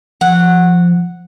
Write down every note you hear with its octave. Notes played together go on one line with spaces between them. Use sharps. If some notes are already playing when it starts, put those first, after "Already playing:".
F3 F#5